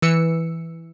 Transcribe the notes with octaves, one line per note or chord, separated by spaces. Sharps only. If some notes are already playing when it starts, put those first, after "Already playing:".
E3 E6 C#7